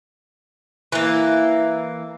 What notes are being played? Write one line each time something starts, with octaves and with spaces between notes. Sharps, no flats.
E3 A#3